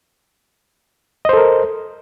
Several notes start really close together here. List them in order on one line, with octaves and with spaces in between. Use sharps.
D#5 C5 A4 A#4